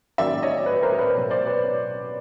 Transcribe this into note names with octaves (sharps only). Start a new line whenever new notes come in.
D#3 F#3 A#3 C#4 D5 E5
C#5 D#5
B4 C#5
A#4 C5
B4 C#5
B2 F#3 A#3
C5 D5
B4 C#5